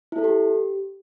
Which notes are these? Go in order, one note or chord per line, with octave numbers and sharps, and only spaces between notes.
E4
A4
G4